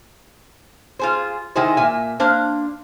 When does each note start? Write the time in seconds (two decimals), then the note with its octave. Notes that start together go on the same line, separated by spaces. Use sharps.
0.99 F4 G#4 C5
1.56 D#3 G#3 E4 G#4 C5
1.77 A#2 A#3 E5 G#5
2.20 A#3 D4 C5 F5